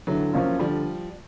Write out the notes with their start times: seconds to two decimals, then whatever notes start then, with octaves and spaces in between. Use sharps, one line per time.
0.07 D3 E3 F#3
0.33 F3 A#3 C#4 F4
0.59 D3 F3 G3